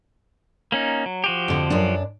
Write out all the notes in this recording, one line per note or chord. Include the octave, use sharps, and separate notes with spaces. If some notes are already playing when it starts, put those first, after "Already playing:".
A#3 C#4 D#4
F#3
F3 F#4 G4
F2 D3
F#2 D4